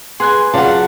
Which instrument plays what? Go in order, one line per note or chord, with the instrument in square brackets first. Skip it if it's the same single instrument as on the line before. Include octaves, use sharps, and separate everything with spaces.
[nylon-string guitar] B3 [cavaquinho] G#4 G#5 [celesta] C6 F#6
[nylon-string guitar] C#3 F#3 [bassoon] F4 [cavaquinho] D5 F#5 [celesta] A5